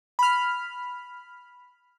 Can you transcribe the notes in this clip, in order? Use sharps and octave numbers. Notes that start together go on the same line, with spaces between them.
B5 F6